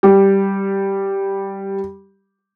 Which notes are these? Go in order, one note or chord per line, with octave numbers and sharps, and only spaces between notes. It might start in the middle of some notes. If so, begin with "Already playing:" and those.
G3 G4